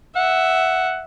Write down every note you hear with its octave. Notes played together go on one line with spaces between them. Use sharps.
E5 F#5